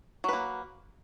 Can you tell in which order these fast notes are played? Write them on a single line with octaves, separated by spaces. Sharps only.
F#3 B4 A#3